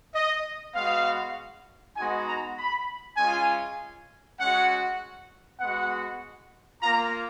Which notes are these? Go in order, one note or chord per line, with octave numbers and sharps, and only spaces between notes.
D#5
G#3 B3 F#4 F5
G#3 B3 D#4 F#4 G#5
A#5
B5
G#3 C#4 F4 G#5
G#3 C#4 F#4 F#5
G#3 B3 F#4 F#5
A#3 F4 A#5